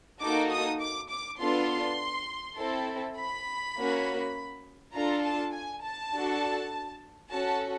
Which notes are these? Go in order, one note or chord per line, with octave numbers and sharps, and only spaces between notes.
A#3 D#4 F#4 A4 D6
D#6
D6
D6
B3 D4 F4 A4 C6
C4 E4 A4
B5
A#3 C#4 F#4
D4 F4 A4 A#5
A5
G#5
A5
D4 F#4 A4
C#4 F#4 A4 A5